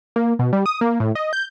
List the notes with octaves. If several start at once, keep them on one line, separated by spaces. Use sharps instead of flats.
A#3
B2
G3
D#6
A#3
A2
D#5
G6